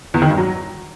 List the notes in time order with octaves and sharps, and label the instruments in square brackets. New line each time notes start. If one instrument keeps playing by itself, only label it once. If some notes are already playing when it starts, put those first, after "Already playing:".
[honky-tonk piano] E2
D#3
G2
F#3